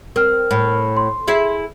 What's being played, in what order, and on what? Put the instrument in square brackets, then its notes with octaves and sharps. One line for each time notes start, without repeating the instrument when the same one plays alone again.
[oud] C4 [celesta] A#4 F6
[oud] A2
[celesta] C6
[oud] E4 G#4 E5